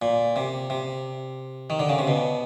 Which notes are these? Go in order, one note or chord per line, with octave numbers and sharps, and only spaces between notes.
A#2
C3
C3
D#3
D3
C#3
C3
B2